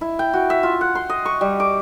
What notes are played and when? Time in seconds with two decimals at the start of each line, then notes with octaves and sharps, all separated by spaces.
0.01 E4
0.19 G5
0.33 F#4
0.50 E5
0.63 F4
0.81 F#5
0.95 C6
1.10 D#5
1.26 C#6
1.41 G3
1.60 D6